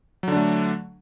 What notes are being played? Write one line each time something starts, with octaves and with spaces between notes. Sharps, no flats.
D3 F#3 A3 D4